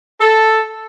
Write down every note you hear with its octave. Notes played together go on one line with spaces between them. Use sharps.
A4